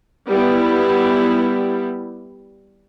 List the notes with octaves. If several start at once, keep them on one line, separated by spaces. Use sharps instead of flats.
G3 B3 E4